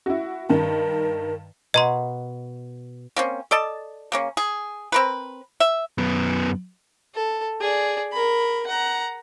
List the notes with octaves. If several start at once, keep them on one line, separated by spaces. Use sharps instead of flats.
E4 F#4
G2 D#3 A#4
B2 D#5 A#5 C6
A#3 C4 C#4
A4 D5 D#5 A5
C#3 A#3 C#4
G#4
C4 A#4 B4
E5
F#2 B3
A4
G#4 D5
A#4 B5
F#5 A#5